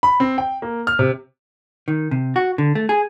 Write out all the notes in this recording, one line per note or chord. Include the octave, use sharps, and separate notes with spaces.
B5
C4
G5
A#3
F6
C3
D#3
C3
F#4
D3
A3
G#4